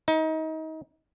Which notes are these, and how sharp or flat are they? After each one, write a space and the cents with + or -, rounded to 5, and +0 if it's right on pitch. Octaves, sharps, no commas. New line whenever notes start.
D#4 +30